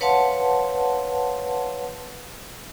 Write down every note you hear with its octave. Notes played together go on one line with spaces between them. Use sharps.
B4 C#5 F5 F#5 A5 C6